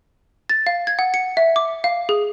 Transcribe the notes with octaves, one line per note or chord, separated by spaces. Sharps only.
A6
F5
G#6
F#5
C#7
E5
D6
F5
G#4